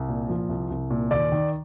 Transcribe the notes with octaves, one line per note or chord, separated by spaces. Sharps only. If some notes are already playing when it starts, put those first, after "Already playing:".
Already playing: C2
A#2
F3
C2
C2
A#2
D#2 D5
D#3